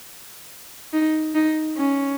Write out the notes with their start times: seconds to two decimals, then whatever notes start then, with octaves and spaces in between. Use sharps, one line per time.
0.93 D#4
1.35 D#4
1.77 C#4